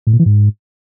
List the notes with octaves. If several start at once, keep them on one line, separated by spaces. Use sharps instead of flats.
A2
A#2
E3
G#2